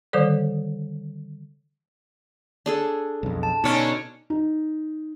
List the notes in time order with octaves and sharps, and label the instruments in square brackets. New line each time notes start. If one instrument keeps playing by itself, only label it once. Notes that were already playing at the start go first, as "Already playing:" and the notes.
[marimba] D3 D#3 G3 A4 C5 D5
[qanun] D4 G#4 A4
[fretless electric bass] B1 F2
[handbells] A5
[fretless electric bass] B2 [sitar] D3 C#4 [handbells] D#4
[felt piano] D#4